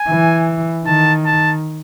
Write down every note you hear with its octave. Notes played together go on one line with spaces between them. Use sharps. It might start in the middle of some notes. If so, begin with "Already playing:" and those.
Already playing: G#5
E3
D#3 A5
A5